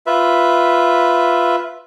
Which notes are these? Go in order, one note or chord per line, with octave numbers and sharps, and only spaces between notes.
F4 B4 E5